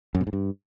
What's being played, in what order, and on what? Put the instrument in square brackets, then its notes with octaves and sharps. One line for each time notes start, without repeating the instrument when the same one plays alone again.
[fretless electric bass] F#2
B2
G#2
G2